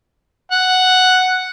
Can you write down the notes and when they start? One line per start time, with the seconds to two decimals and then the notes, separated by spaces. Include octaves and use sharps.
0.52 F#5